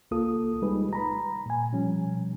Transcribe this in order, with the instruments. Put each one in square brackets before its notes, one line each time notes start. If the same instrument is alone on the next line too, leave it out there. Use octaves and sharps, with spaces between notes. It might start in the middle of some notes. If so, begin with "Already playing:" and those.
[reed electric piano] C#2 A#3 F4 A4 D#6
G3 G#3 D#4 G#4 B4
A#5 B5
A#2 G#5
B2 F3 G3 C#4